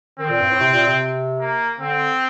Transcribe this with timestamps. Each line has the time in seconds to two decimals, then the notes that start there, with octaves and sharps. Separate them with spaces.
0.19 D#3 C4
0.29 A#2
0.40 G2
0.49 A2
0.60 C3
0.73 A#2
0.87 C3
1.40 A#3
1.80 D3 C4